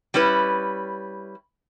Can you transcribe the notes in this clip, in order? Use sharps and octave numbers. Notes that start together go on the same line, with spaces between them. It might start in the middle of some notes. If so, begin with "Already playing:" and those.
G3 C#4 E4 B4